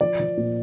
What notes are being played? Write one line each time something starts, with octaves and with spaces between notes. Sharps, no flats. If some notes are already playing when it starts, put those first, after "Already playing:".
F3 D5
F3
A#2